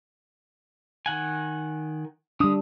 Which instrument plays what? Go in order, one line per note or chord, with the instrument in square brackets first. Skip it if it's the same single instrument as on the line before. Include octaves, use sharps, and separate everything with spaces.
[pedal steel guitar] D#3 F#5 G#5
[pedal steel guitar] D3 D#6 [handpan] G3 D4